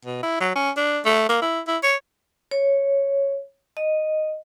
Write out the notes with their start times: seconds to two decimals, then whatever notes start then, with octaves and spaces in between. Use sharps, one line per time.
0.05 B2
0.23 E4
0.40 F#3
0.55 C#4
0.77 D4
1.05 A3
1.29 A#3
1.42 E4
1.68 E4
1.83 C#5
2.51 C#5
3.77 D#5